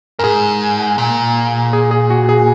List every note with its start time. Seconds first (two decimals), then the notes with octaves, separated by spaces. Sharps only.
0.19 F#2 A#4
0.24 G#2 G#4
0.98 A#2
1.73 G#4
1.91 G#4
2.10 F#4
2.29 G#4